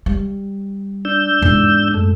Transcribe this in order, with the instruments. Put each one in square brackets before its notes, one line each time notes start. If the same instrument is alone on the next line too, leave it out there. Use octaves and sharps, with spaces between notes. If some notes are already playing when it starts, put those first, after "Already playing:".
[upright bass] G3
[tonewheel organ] D4 E6 G6
[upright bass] E2 G#2
[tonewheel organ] F#2 A3